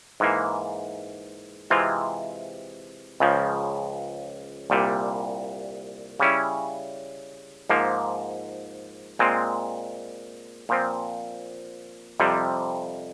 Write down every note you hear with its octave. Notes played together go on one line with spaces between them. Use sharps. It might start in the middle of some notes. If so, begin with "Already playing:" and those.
G#2 E3 A#3
C3 E3 G#3 C4 F4
C#2 C#3 F3
C2 A#2 G3
C#3 G3 C#4 E4
G#2 F3 A#3
A#2 G#3 C4
A#2 F3 C4
F2 C3 G3